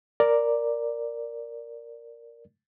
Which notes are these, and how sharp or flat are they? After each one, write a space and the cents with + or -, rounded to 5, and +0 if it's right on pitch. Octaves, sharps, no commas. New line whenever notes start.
A#4 +0 D5 +0